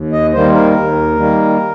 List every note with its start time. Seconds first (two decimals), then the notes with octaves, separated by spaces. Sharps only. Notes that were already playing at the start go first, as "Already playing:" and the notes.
Already playing: D#2
0.12 D#5
0.33 D#3 G3 A#3 C5
0.54 A#4
0.75 D#2
1.16 D#3 G3 A#3